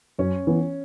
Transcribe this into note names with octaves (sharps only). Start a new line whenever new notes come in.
F#2 C#4
E3 B3